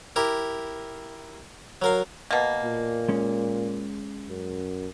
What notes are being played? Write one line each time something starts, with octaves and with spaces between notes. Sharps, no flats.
E4 G4 A#4
F#3 A#4 F5
B2 A#3
A#2
G#3 C#4
F#2